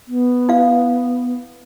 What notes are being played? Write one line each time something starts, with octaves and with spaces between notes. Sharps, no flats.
B3
E4 F5